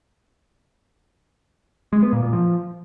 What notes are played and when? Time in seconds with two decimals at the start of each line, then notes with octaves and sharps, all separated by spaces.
1.93 G#3
2.03 B3
2.13 A#2
2.23 A#2
2.33 F3